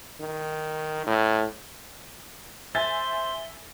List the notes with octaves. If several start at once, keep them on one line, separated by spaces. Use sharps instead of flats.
D#3
A2
C5 E5 G#5 A6 G7